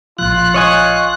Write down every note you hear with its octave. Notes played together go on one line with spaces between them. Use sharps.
A1 A#2 F3 F4 F#6
C#5 D#5 G#5